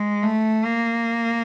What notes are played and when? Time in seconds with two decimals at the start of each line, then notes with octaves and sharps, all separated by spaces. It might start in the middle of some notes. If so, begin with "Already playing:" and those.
Already playing: G#3
0.23 A3
0.65 A#3